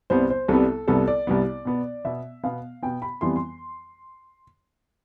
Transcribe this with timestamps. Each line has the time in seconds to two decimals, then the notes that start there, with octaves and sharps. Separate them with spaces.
0.10 C2 C3 G3 B3 C5
0.30 C5
0.48 C2 C3 G3 B3 A4
0.88 C2 C3 G3 B3 A4
1.07 D5
1.27 C2 C3 G3 B3
1.65 B2 B3
2.05 B2 B3 E5
2.43 B2 B3 F5
2.82 B2 B3 G5
3.02 B5
3.21 F2 E3 G3 B3 C6
3.36 C6